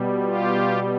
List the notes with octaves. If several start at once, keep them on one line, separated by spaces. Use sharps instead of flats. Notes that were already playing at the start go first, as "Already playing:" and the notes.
Already playing: B2 G3
F4 G4